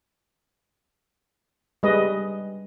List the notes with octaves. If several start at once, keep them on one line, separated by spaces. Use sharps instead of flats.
G3 G#3 B4 D#5